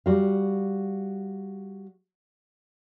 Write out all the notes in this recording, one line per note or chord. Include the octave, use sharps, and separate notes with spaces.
G3 F#4 F5